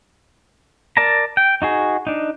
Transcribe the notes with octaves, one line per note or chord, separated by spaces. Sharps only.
A#4 D5 A5 A#5
G5
D#4 F#4 G#4
D4 D#4